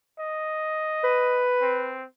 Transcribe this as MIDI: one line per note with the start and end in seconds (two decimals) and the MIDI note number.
0.19 1.47 75
1.04 1.98 71
1.61 2.05 60